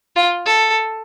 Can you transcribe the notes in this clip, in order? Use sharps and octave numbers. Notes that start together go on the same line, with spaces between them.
F4
A4